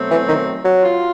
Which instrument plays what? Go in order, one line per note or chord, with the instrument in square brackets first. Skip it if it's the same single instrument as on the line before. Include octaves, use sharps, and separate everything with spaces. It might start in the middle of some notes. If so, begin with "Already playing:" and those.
Already playing: [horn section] B2 F#3 A3 C4
[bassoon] E3
D#3
F#3
[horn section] F4